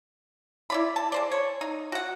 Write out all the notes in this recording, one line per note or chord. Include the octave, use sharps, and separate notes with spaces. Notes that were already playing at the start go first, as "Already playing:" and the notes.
E4 D5 B5
A5
G#3 C5 D5
C#5
D#4
F#4 F#5